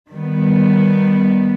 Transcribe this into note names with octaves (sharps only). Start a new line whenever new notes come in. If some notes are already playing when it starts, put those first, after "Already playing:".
D#3 G3 B3